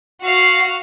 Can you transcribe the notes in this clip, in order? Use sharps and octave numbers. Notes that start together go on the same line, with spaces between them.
F#4 F5